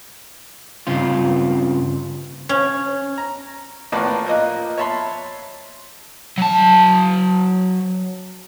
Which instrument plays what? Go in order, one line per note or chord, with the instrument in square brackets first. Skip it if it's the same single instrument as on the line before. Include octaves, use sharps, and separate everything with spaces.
[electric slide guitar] G2 C#3 C4 F4
[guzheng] C#4
[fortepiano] A#5
A#1 A2 A#3 B4 D5 A5
F3 A#3 D#5 F#6
C#5 E5 A5 B5 C6
[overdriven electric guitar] F#3 A5